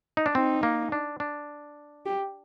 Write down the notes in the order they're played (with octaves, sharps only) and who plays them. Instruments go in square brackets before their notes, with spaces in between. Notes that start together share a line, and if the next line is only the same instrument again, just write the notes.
[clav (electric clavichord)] D#4
D4
[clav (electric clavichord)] C4 [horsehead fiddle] D#4
[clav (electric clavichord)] A#3
D4
D4
[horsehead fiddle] G4